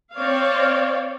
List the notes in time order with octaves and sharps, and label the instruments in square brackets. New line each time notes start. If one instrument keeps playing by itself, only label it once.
[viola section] C4 C#5 D5 F5